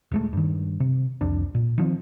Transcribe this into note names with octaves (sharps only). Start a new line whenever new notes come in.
D#1 G#3 A3
G2 D#3
C3
C2 F2 D4
A#2
D#3 F3 C4